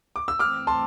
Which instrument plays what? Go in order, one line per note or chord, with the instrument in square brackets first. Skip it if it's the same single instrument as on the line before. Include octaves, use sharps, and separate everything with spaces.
[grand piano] D6
E6
[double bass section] G2 E3 A3 C4 [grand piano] D6 F6
[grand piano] A5 C6